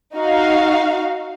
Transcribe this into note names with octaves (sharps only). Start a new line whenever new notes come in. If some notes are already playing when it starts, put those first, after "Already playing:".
D#4 F#4 F5